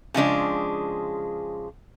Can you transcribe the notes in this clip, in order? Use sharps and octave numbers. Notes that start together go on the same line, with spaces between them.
C#3 F3 G#3 D4